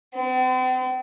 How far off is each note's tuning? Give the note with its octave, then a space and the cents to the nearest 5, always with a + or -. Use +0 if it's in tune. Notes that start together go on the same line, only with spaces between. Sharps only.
C4 -45